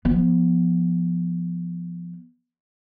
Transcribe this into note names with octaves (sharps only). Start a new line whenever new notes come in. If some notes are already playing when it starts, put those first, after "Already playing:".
F3 B3